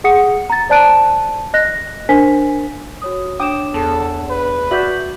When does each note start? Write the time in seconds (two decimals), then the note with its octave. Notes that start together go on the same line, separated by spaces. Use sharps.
0.04 G#4 F#5 D#6 C#7
0.50 A#5 A6
0.69 C5 D5 A5 F#6 D7 D#7
1.54 D#5 F#6 A#6
2.09 D4 A#4 C5 G#5 B6
3.02 F#4 C#5 D#6
3.40 D4 C#5 G5 D6 D#6 E7
3.74 E2 A4
4.30 B4
4.71 F#4 D5 E5 G6 B6 F#7